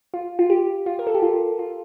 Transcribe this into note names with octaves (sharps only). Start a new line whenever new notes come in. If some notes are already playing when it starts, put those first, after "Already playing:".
F4
F4
G4
F4
A#4
A4
G4
F4
F4